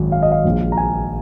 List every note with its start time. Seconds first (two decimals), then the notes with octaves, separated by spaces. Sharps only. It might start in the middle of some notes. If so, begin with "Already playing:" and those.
Already playing: G#1 F#2
0.12 F5
0.22 D#5
0.32 F5
0.45 A#1 A#2 G#3
0.72 A#5
0.77 G#5